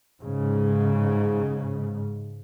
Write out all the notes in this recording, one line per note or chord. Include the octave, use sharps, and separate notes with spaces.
G#2 C#3